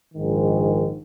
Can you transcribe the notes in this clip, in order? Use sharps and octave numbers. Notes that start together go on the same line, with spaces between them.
A#1 G#2 D#3